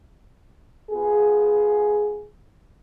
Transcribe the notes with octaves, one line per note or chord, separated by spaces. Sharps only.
B3 F4 G#4